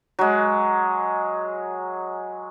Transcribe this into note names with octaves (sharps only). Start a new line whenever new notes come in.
F#3 G#3